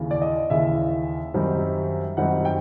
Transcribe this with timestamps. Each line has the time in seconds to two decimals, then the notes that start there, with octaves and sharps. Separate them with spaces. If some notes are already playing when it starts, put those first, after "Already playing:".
Already playing: D#2 C#3 E3
0.11 D5
0.22 D#5
0.50 D#2 C#3 E3 E5
1.34 F#2 D#3 G3 C4 D#4
2.17 F#2 D#3 G3 C4 D#4 F#5
2.45 G5